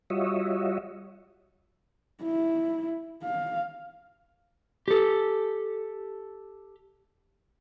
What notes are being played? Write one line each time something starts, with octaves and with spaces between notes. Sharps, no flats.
G3 F4 F#4 C#5 D#5 E5
E4
F5
G4 A4